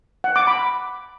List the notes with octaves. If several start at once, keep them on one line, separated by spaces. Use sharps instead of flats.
F#5
D6
B5